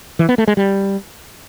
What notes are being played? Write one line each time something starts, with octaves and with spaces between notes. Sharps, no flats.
E3
B3
A3
G#3
G3